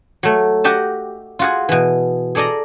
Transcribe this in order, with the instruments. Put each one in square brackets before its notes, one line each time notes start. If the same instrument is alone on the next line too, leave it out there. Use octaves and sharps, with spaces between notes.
[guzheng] F#3 A3
F#4 G4 D#5 A5
F4 F#4 G#4
B2 E3
G#4 A4 D5 D#5 A#5